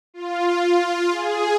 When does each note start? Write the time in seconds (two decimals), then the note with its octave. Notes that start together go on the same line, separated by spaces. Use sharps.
0.14 F4
1.11 G#4